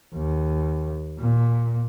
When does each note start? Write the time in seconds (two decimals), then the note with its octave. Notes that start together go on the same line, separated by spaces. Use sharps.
0.15 D#2
1.19 A#2